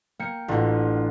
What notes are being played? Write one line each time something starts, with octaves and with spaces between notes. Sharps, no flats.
A#3 G5 C#7
A1 D3 F4 F#5